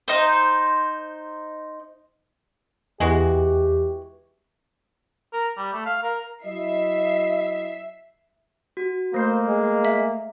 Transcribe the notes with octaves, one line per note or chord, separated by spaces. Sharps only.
D#4 C5
E2 E3 G#3 F#4 G4
A#4
G3
A3
F5
A#4
F#3 E4 D#5 E5 C7
F#4
A3 A#3 C5 C7
G#3
E5